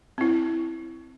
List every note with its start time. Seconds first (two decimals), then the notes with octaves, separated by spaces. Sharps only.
0.18 C4 E4